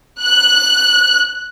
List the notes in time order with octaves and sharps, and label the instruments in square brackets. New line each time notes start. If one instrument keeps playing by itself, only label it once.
[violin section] F#6